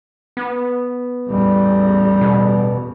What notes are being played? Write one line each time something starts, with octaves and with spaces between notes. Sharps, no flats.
B3
A1 E2 G3
B2